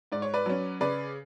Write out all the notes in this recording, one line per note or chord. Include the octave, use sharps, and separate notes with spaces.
G#2 D5
C#5
B4 D5
F#3 C#4
C#3 B4 D5